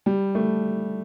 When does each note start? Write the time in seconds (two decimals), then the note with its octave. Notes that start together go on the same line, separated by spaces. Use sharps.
0.06 G3
0.35 A3